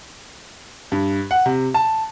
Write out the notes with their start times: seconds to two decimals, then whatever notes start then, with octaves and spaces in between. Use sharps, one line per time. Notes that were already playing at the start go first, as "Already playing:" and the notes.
0.92 G2
1.31 F#5
1.46 C3
1.74 A5